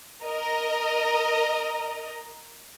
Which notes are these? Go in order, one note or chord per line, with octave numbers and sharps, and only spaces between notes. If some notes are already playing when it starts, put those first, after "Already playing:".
A#4 D#5